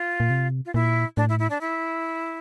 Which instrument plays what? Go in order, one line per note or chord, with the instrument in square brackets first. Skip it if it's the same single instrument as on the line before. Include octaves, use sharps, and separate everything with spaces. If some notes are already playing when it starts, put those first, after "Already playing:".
Already playing: [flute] F4
[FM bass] A#2
C3
[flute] F4
[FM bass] A#2 [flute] E4
[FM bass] A2 [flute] D4
[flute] E4
E4
D4
E4